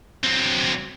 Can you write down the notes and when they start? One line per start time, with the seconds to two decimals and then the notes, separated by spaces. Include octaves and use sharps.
0.23 F#3 C4